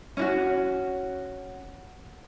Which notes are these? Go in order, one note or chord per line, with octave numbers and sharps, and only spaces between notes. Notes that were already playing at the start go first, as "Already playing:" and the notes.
C#4 E4 F#4